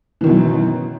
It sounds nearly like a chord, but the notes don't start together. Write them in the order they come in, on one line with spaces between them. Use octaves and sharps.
E3 D#3 B2 F#2